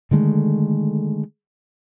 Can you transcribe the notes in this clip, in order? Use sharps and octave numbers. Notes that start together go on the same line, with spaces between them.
D3 D#3 G#3 A3